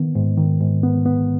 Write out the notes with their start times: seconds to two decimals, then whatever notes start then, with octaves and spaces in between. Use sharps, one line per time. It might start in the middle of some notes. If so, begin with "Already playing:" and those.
Already playing: D#3 B3
0.15 G#2
0.38 D#3
0.61 G#2
0.83 B3
1.06 B3